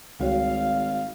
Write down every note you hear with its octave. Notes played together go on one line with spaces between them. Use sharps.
G#1 C#2 G3 F#4 C#5 F5